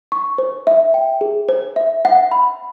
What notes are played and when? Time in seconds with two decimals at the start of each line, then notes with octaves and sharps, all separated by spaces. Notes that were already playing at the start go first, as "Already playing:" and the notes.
0.12 C#6
0.38 C5
0.67 E5
0.94 G5
1.21 G#4
1.49 C5
1.76 E5
2.05 F#5
2.31 B5